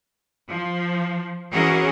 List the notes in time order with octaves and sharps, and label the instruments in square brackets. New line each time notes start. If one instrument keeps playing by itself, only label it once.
[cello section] F3
E3 C#4 F#4 G#4 A#4